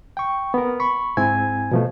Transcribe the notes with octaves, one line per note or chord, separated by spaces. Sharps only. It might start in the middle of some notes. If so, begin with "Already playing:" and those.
G5 C#6
B3 A#4
B5 C#6
G#2 C4 E4 G#5 G#6
B2 F3 A3